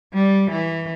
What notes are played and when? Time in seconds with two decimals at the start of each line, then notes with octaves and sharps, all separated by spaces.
0.14 G3
0.52 E3